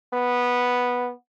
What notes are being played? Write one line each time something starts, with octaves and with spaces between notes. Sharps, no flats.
B3